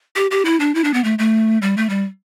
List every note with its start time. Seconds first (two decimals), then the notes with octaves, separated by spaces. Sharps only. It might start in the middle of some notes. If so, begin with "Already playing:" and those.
0.16 G4
0.31 G4
0.45 E4
0.60 D4
0.75 E4
0.84 D4
0.94 B3
1.04 A3
1.19 A3
1.62 G3
1.77 A3
1.90 G3